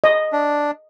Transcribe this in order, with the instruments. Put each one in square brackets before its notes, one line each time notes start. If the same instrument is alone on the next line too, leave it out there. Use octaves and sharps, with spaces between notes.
[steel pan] D#5
[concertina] D4